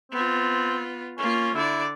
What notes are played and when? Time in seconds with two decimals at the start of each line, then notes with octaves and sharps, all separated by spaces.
0.12 B3 C4 F4
1.18 A#3 C#4 F4
1.55 D3 E4 D5